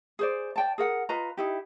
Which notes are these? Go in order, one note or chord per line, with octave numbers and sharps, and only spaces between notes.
G#4 C5 D5
D5 G5 A5
G#4 A#4 F#5
F4 B4 D#5 A#5
D#4 E4 G4